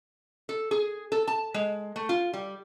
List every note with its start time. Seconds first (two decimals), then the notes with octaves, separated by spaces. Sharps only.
0.49 A4
0.71 G#4
1.12 A4
1.28 A5
1.54 G#3
1.96 A3
2.09 F4
2.34 G3